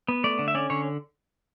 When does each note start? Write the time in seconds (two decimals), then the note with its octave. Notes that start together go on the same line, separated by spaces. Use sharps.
0.08 B3
0.24 A3 D5
0.39 D3
0.48 E5
0.55 C#4 D5
0.70 D3 C#5